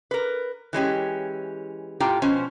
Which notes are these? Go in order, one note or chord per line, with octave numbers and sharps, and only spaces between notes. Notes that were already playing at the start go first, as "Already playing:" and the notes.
A#4 B4
E3 G#3 C#4 G4
A2 F4 G4 G5 A#5
B2 F3 C#4 C5